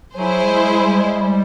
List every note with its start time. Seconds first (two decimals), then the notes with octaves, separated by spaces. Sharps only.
0.16 F#3 E4 G#4 C5
0.43 G3
0.48 G#3
0.80 G3
1.01 G#3
1.21 G3